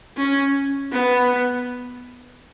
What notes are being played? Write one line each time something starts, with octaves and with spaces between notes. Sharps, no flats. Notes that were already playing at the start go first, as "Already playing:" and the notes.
C#4
B3